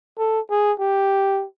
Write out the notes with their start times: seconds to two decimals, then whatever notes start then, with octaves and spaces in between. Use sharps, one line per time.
0.19 A4
0.51 G#4
0.80 G4